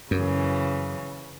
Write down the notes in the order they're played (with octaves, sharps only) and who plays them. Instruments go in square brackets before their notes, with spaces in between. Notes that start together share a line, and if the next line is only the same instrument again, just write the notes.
[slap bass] F#2 [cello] C#3 E3